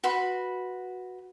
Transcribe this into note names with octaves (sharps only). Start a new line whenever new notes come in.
F#4 B4 B5 C6